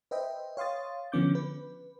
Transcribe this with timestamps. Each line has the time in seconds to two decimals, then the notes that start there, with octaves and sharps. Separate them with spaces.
0.11 B4 C5 D#5 E5 G5
0.57 C#5 F5 C6 D#6 A6
1.12 D3 F3 B3 C#4 D6 G6
1.35 B4